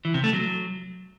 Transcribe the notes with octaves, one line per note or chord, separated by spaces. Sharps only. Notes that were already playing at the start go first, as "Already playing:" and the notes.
E3
C3
A3
F#3